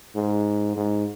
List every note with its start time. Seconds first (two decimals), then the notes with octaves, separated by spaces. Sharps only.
0.16 G#2
0.76 G#2